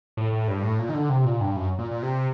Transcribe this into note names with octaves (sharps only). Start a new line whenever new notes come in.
A2
A2
G2
A2
A#2
D#3
D3
C3
A#2
G2
F#2
A#2
A#2
C3